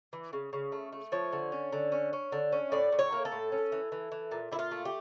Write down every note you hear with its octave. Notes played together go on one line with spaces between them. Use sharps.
E3
C#3
C#3
A3
A3
F3 C#5
D3
C#4
D3
C#4
C#4
D3
C#4
A2 D5
A2
C#5
A#3
A4
A2
C#4
E3
E3
E3
A#2
A#2 E4
F4
A3
G4